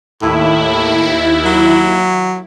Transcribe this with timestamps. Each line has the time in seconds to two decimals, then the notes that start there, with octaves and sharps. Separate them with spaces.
0.22 D#2 A2 E4
1.45 F#3